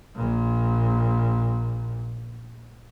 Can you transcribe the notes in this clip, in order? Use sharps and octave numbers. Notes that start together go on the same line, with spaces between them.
A#1 A#2